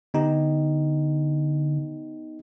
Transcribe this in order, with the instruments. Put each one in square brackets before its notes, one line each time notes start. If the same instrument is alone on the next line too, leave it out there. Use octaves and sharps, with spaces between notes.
[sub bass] D3 [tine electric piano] B3 D#4 G4